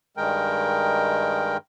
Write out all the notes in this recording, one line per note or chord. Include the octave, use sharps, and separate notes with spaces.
G2 D#3 G#3 A#4 G5